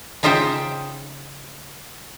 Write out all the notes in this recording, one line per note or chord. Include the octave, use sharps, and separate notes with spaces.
C#3 D#4 F4 C5 E5 G5